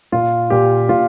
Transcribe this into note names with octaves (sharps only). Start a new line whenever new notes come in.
A#2 F4
A#2 G4
A#2 F4